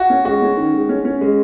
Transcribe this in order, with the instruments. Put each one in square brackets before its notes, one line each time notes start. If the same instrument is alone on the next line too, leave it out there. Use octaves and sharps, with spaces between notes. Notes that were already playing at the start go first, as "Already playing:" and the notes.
Already playing: [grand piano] F#4
[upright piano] C#4
[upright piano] G#3 [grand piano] F#4
[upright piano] C#4
D#3
G#3
C#4
C#4
G#3